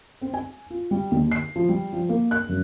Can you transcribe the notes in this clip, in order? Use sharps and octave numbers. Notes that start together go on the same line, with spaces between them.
C4
G#5
F4
G3
D#2
C7
F3
G3
F3
A#3
F#6
F#2